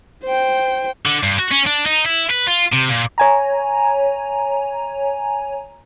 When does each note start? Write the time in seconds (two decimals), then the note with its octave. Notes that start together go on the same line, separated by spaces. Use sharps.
0.24 C5 G5
1.06 D3
1.23 G2
1.39 F#4
1.51 C#4
1.66 D4
1.86 D#4
2.05 E4
2.31 B4
2.47 F4
2.73 C3
2.90 A#2
3.18 C#5 G#5 A#5